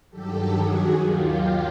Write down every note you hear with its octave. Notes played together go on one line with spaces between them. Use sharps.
G2 D#3 F#3 G4 A4
F#4 G#4
D#2 D#3 F#3 F4 G4